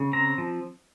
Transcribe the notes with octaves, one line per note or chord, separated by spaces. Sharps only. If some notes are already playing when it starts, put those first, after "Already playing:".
Already playing: C#3
C4 A#5
F3